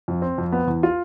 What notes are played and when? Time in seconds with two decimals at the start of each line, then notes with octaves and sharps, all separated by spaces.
0.08 F2
0.22 C4
0.38 F2
0.52 B3
0.67 E2
0.83 F4